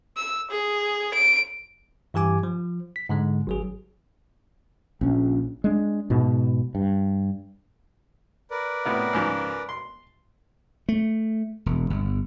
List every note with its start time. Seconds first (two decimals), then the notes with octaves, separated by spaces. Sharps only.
0.17 E6
0.51 G#4
1.14 D7
2.14 G2 E3 G4 G#5 D6
2.43 F3
2.96 B6
3.09 G#2 D3 G#3
3.47 G#1 F#3 G#4
5.01 A#1 C#4
5.64 G#3 D4
6.10 G#2 B2
6.75 G2
8.51 A#4 B4 D5
8.85 A2 C3 B3
9.13 C#2 G#2 F3
9.69 C6
10.89 A3
11.66 E1
11.90 G1